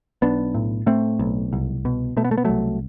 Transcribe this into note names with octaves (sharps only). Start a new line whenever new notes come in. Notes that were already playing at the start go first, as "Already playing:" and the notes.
B1 B3 D4
A2
A2 A3 C4
B1
C2
B2
B2 A3
B3
A3
B3
C2 F#3 A3